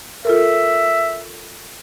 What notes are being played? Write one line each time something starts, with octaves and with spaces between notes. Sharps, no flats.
F4 A4 A#4 E5